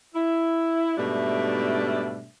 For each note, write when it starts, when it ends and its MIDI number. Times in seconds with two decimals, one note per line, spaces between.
0.14 0.94 64
0.97 2.29 44
0.97 2.29 47
0.97 2.29 55
0.97 2.29 57
0.97 2.29 62
0.97 2.29 76